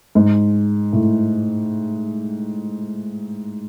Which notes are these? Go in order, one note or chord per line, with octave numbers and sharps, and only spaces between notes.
G#2
A2